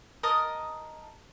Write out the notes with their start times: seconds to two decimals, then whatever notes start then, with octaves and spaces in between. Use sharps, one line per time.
0.23 A#4 D#5 A5 D#6